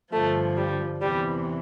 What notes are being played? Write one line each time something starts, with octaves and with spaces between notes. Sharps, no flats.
G2 D3 F3 A3
G3
E2 C3 E3 G3